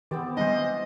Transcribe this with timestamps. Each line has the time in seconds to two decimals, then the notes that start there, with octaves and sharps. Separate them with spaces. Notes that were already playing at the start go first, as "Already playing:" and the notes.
0.11 D#3 E3 B3 C4 G4 D5
0.37 G#2 D#3 E3 G3 D4 C5 D#5